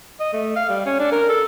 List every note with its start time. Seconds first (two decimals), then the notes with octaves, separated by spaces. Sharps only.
0.20 D#5
0.33 A3
0.56 F5
0.69 G3
0.86 C#4
0.99 D4
1.12 A#4
1.29 A4